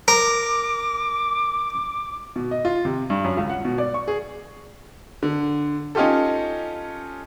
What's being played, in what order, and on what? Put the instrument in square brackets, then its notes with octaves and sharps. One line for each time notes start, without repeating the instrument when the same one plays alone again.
[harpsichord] A#4 [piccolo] D6
[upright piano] B2
D#5
F4
C3
G2
F#2
C#2
F#5
B2
D5
C#6
G#4
[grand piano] D3
C#4 D#4 F4 G4 A4